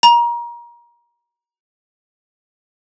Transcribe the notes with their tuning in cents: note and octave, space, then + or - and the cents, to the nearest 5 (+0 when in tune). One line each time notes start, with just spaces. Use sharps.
A#5 +30